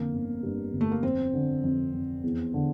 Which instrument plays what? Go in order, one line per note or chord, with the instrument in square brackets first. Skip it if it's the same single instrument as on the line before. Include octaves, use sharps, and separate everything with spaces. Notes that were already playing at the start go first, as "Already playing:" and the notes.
Already playing: [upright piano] F2 D3 [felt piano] A#3
[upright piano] G1
G2
G1
[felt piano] A3
A#3
[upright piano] F2 [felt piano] C4
[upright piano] D3
F2
F2
E2
D3